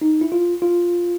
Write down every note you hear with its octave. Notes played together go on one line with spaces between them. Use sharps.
D#4
E4
F4
F4